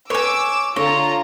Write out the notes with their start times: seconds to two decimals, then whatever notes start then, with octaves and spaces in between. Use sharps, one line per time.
0.10 B4 C#5 G#5 D6 E6
0.76 D3 F4 C#5 A5 A#5